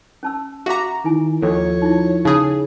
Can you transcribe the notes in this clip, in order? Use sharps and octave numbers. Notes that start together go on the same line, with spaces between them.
C#4 A5 E6
F#4 E5 F5 A#5 D6
D#3 E4 G#5
D#2 F3 A4 C#5
D#4 E4
C#3 D#4 G#4